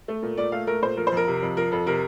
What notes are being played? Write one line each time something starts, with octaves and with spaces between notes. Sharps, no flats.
A3
A#2
A#2 D5
A3 F5
A3 A#4
A#2 C5
F3 A#4
C5
F2 A#4
C3
F2
F3 A#4
F2 A4
C3 A#4